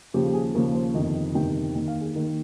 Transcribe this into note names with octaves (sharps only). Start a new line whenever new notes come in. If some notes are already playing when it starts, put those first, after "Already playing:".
D#2 C#3 F3 G4
G4
G#4
D#2 C#3 F3 A#4
C5
G1 F2 C3 D#3 D#5
D#5
G1 F2 C3 D#3 G5
D#2 D#3 G5
F5
G#4
D#2 D#3 A#4